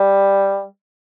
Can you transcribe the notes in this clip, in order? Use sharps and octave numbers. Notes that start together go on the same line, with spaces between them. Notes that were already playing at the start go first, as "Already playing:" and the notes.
Already playing: G3